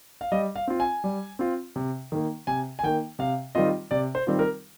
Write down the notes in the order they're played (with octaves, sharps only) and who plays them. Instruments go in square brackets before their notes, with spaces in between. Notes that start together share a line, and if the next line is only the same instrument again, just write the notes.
[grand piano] F5
G3 D#5
F5
C4 F4
G#5
G3
C4 F4
C3
D#3 A#3
C3 G#5
G#5
D#3 A#3 G5
C3 F5
D#3 G3 C4 F4 D#5
C3 D5
C5
D#3 G3 C4 F4
A#4